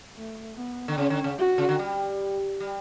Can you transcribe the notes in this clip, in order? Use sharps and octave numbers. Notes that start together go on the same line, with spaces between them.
A3
B3
D3
C#3 C#4
D3
C#3
F#4
C#3
D3
G3
G3